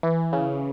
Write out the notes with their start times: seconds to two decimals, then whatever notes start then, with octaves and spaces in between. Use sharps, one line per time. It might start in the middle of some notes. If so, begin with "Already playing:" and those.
0.03 E3
0.33 C#3